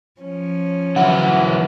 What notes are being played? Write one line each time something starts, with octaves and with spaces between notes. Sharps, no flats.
F3 C#4
E3 F#3 E4 F#5